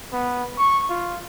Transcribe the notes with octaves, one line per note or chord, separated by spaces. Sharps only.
B3
C#6
F4